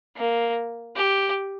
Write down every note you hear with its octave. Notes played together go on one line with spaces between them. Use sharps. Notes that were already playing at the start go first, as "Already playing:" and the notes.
A#3
G4